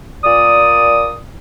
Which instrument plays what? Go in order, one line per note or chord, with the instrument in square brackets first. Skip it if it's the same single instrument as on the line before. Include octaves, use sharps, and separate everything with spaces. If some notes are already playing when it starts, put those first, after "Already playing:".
[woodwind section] A#2 D5 D#6